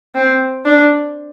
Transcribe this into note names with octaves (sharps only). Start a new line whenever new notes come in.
C4
D4